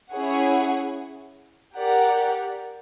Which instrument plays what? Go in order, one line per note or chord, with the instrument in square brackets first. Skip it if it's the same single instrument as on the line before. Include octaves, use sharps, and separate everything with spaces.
[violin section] C#4 E4 G#4 C#5 F#5
G4 A#4 D5 F#5